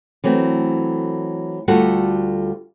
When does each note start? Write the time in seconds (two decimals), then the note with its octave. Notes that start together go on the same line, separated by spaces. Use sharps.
0.24 E3 F#3 A3 C4
1.68 D2 G3 F4 F#4 A4 F#5